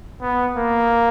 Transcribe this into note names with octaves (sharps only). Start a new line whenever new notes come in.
B3
A#3